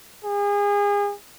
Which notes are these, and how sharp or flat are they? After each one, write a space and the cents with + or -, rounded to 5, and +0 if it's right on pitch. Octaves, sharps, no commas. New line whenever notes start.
G#4 -35